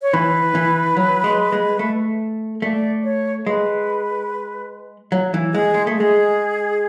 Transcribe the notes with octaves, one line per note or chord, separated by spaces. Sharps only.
C#5
E3 B4
E3
F#3
G#3
G#3
A3
A3 D5
C#5
G#3 B4
F#3
E3
G#3 G#4
G#3
A3
G#3 G#4